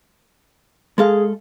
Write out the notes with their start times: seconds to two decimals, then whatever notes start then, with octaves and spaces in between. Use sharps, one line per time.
0.98 G#3 G#4 A4 F5